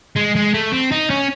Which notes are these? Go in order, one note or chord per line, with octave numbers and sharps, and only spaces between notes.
G#3
G#3
A3
C4
D#4
C#4